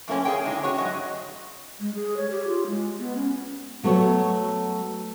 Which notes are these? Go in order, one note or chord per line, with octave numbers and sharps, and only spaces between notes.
F#2 A#2 A3 A#3 C#4
G#4 C#5 G5
A2 D3 G#3 D#4
C#4 F#4 C#5
G#2 F#3 D#5
G#3
G#4
C#5
G4
F4
G#3
B3
C#4
F#3 A3 B3 F#4 C#5